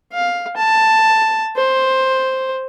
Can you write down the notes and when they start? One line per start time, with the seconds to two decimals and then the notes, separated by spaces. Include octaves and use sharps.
0.12 F5
0.57 A5
1.57 C5